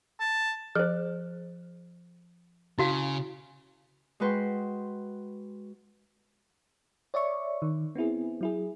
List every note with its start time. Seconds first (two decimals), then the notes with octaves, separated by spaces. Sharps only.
0.20 A5
0.75 F3 G#4 C5
2.78 C#3 E4 F#4 F5
4.20 G#3 F#4 B4 G5 C6
7.14 C#5 D5 E5 C#6
7.62 D#3
7.95 B3 C4 E4 G#4
8.41 F#3 E4 G#4